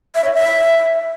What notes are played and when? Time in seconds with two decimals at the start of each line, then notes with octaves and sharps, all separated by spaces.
0.15 E5
0.24 C#5
0.34 E5